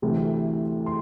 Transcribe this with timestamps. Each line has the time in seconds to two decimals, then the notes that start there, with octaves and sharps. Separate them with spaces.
0.02 D2 C3 E3 A3
0.86 C6